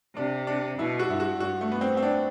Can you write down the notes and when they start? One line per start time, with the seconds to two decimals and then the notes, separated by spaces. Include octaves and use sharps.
0.16 C3 D4
0.47 D4
0.79 B2 E4
1.00 F#4
1.10 G2 E4
1.20 F#4
1.40 G2 F#4
1.61 A3
1.72 B3
1.81 C4
1.97 C4
2.02 D4